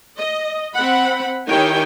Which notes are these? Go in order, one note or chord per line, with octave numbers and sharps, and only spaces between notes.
D#5
C4 F#5 B5
D#3 E4 G4 C#5 G5 G#5